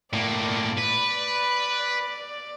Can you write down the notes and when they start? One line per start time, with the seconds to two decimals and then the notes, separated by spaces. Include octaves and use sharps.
0.13 A2 A#3 D5
0.78 B4